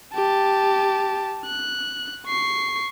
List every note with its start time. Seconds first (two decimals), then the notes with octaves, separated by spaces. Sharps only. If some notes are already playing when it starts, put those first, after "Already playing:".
0.13 G4 A5
1.46 F#6
2.27 C#6 C7